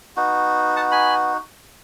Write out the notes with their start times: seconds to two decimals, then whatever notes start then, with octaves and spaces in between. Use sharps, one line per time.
0.17 B3 D#4 F#4
0.76 F#5 A5
0.91 G#5 B5